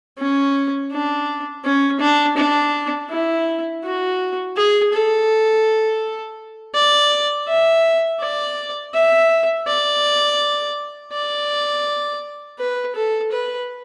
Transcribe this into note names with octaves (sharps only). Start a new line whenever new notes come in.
C#4
D4
C#4
D4
D4
E4
F#4
G#4
A4
D5
E5
D5
E5
D5
D5
B4
A4
B4